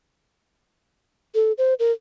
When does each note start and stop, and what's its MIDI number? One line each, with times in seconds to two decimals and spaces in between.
1.35 1.52 69
1.58 1.74 72
1.79 1.92 70